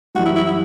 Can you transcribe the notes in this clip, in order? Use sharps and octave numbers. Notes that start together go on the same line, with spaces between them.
F#2 E3 G3 F#4
E4
E4
E4